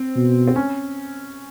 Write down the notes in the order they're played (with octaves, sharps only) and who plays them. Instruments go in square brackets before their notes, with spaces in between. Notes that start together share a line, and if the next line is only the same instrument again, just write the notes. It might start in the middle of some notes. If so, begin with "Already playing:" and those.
Already playing: [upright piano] C4
[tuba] B2
[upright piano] C4
C#4